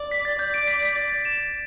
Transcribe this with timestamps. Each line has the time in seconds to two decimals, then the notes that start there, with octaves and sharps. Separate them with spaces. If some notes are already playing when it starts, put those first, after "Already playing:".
Already playing: D5
0.11 B6
0.25 A6
0.39 D5 G6
0.54 D7
0.67 B6
0.83 B6
0.96 A6
1.10 A6
1.25 E7